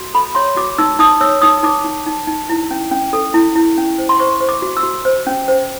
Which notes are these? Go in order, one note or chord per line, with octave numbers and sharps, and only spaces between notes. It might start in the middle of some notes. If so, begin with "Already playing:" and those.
Already playing: F#4
A4 B5
C#5 C6
F#4 D6
D#4 E6
D#4 D#6
C#5 E6
D#4 D#6
D#4 D6
D#4
D#4
D#4
E4
C#4
C#4
A4
E4
E4
C#4
C5
C6
C5 C#6
C5
D6
F#4
E6
F#4
C5
C#4
C5